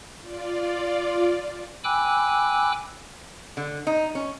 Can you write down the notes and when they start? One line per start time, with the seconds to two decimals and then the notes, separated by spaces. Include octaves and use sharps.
0.22 F4 D5
1.84 G5 G#5 B5 D6 E6 F#6
3.57 D3
3.87 D#4
4.15 C#4